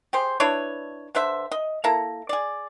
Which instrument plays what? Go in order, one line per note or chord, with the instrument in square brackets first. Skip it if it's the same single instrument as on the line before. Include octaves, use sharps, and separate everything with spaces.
[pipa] G4 G#4 C5
D4 E4 B4 C#5
D3 B4 C5 E5
D#5
A#3 E4 A4 A#5
G#4 D5